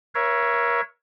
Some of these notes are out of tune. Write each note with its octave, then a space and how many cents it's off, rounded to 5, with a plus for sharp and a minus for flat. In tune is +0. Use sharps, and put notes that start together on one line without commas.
A#4 +35 C#5 +0 E5 +25